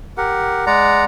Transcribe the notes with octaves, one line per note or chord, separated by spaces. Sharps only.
G4 A#4 F#5
G#3 D5 F#5 A#5